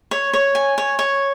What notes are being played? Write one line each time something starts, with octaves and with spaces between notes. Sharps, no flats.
C#5
C#5
G#5
C#5
C#5